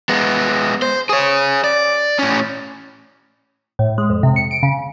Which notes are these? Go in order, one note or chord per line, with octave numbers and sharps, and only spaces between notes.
G#3 B3
C5
G#4 C#5
D5
A2 C#4
A2
G#3
F2
C3
C#7
D7
C#3
C#3